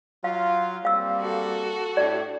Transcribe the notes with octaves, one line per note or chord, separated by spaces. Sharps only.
F#3 F4 F5
G3 A#3 C4 F5 E6
F#4 A4
A2 D4 G4 D5